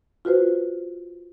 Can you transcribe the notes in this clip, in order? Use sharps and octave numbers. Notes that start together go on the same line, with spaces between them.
F4 F#4 B4 C5